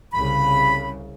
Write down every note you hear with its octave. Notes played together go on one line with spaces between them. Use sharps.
C2 C#3 B5